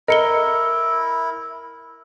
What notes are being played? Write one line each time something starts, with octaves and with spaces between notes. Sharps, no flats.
E4 A#4 D#5 C#7 G7